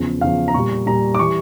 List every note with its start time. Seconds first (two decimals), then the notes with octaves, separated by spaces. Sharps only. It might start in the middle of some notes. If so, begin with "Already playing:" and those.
Already playing: E2 C#3 F3
0.21 E2 C#3 F3 F5
0.48 A#5
0.54 A#2 G3 C#6
0.86 A#2 G3 A#5
1.15 D6
1.19 E3 G3 C#6